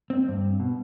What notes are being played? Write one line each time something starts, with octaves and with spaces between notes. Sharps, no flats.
C4
G2
B2